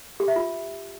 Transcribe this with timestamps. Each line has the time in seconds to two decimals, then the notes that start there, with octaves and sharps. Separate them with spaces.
0.20 G4
0.28 E5
0.36 F4